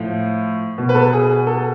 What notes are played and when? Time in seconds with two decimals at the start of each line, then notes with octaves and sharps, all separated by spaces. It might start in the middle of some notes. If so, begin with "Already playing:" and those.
Already playing: A2 F3
0.78 B2
0.89 B4
0.95 A4
1.13 G#4
1.30 G#4
1.47 A4